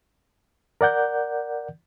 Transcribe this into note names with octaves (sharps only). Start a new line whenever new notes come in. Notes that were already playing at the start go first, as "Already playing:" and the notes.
A#4 D5 F#5 G6